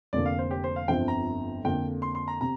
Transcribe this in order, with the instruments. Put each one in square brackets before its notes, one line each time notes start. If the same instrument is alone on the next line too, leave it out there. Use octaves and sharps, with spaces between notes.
[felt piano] F1 F2 D3 A#3 [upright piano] D5
[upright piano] F5
C5
G4
C5
F5
[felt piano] G1 F2 F3 C4 [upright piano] G5
[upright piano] A#5
[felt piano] F2 D3 A#3 [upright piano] G5
[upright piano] C6
C6
A#5
[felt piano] C3 [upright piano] A#5